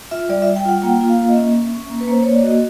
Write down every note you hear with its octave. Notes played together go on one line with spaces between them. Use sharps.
F4 E5
G3 D5
G3 E5
G5
F4 F#5
A#3 G5
F4
F5
A#3
D#5
C#4 E5
C#4
C#4
A#3
B4
A#3 C5
A#3 C#5
D5
F#4 D#5